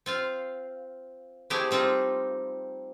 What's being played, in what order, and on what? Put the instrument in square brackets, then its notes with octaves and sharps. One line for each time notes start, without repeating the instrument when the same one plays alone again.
[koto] C4 F4 F5
A3 C4 E4 G4 G#4
G3 C4 D#4 F4